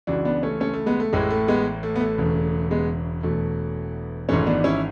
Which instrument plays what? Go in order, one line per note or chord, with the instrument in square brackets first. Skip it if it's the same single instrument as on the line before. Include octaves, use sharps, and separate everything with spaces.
[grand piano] C#2 C#3 E3 D4 F#4
B3 D4
A3 C#4
A3 C#4
A3
G#3 B3
A3
A1 A2 E3 G#3
A3
G#3 B3
A3
B3
A3
E1 E2 C#3
G#3 B3
E1 E2 B2 A3
G#1 G#2 E3 A3 C#4
B3 D4
C#4 E4